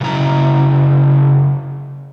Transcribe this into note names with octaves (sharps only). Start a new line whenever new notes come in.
C#3 F#3 E4 A#5